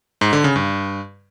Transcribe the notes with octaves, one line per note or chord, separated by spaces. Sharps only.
G#2
D3
C#3
G2